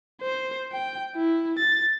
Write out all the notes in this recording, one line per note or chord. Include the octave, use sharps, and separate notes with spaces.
C5
G5
E4
A6